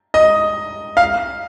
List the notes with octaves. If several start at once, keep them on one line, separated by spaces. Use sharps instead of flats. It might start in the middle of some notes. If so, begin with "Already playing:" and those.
D#5
F5